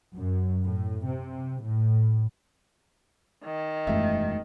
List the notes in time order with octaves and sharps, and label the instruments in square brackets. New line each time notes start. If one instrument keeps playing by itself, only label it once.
[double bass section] F#2
A2
C3
A2
[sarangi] D#3
[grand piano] E1 E5 [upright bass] F#2 A3